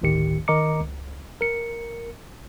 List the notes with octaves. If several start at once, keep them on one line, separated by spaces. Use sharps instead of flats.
G1 D2 A2 D#3 G4 C#7
D#3 A#4 D#5 A#5 D6 C#7
C#2
A#4 C#7